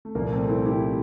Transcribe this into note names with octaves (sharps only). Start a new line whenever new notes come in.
A3
C2 A#2 F3 A#3
A3 C4
C4 E4
E4 G4